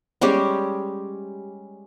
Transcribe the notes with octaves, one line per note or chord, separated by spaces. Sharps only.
G3 G#3 C#4 G4